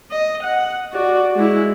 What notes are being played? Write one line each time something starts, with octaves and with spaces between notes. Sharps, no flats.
D#5
F#5
F#4 D5
G#3 E4